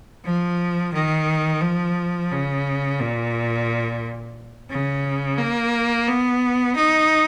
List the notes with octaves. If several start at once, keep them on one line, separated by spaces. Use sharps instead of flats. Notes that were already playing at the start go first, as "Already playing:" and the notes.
F3
D#3
F3
C#3
A#2
C#3
A#3
B3
D#4